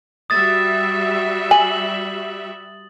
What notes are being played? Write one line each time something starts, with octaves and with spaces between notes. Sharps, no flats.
G3 F#4 E5 D#6 A6
G#5 F#7